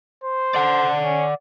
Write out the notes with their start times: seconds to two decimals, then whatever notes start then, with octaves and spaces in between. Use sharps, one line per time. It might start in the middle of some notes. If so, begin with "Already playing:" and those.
0.24 C5
0.54 D5 F#5
1.03 C#4